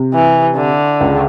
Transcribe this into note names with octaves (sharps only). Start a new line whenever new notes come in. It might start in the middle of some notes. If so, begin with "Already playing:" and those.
Already playing: C3
E3
D3
C#2 C#3